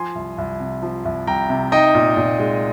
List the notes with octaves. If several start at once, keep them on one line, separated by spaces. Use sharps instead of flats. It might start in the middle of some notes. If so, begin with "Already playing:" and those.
Already playing: F3 G#5 C6
C2
C2
C3
F3
C2
C2 G5 A#5
C3
D#4 D#5 G5
A#2
A#2
G#3